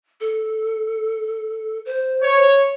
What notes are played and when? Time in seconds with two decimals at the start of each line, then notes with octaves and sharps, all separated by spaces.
0.20 A4
1.85 C5
2.23 C#5